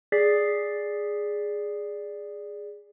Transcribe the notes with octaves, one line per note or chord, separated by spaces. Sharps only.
G#4 D5 A6 B6 C7